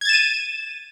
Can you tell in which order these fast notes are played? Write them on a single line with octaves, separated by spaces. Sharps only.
G#6 A6 E7 D#7